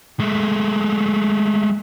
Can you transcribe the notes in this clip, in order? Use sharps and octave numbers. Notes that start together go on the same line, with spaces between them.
G#3 A3